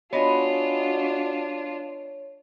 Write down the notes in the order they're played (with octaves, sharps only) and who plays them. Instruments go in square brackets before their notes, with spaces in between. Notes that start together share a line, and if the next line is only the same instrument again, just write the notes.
[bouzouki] B3 D#5 G#5 [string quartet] D4 F4 [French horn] F#4 [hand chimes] C#5